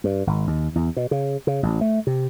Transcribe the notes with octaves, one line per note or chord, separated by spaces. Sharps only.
G2
G#1
D#2
E2
B2
C#3
C#3
A1
A3
C3